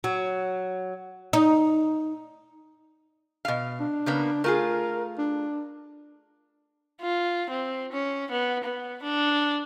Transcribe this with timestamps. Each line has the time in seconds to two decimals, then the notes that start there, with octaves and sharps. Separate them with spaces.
0.04 F#3
1.33 D#4
3.45 B2 F5
3.80 D4
4.06 C#3 A#3 B3
4.44 A3 F4 G#4 A#4
5.18 D4
7.01 F4
7.50 C4
7.92 C#4
8.31 B3
8.64 B3
9.03 D4